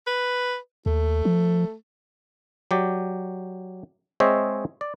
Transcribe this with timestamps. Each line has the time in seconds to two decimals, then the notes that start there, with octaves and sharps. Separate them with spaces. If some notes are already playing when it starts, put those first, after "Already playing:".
0.07 B4
0.86 D#2 A3
1.25 F3
2.71 F#3 G4 D5
4.20 G#3 C4 C5 C#5 D#5 E5
4.81 D5